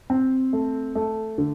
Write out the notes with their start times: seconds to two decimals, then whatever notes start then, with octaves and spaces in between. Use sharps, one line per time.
0.10 C4
0.53 A3
0.95 A3
1.38 D3